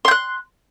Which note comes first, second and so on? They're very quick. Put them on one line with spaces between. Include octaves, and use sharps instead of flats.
C6 G6 F#6